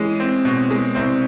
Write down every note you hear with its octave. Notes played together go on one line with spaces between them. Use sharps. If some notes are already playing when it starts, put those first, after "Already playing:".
Already playing: E3 G#3 C#4
C4
B2
G#3
C2 C4